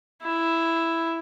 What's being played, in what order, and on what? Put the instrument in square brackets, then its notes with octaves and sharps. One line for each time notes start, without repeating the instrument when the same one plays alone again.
[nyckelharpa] E4